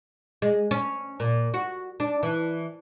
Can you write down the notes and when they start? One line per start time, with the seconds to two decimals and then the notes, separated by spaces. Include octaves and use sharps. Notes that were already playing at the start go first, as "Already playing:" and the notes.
0.42 G#3
0.71 C#4
1.20 A#2
1.54 F#4
2.00 D4
2.23 E3